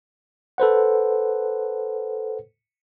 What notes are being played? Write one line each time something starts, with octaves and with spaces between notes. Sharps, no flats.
A4 B4 C5 F#5